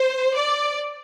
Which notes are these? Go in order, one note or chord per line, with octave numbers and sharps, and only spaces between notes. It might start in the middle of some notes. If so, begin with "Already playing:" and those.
Already playing: C5
D5